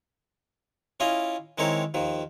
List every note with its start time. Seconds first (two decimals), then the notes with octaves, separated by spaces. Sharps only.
1.00 C#4 E4 F4 D#5 F5
1.58 D#3 G#3 C4 E4 A#4 C#5
1.94 D#2 D#3 F3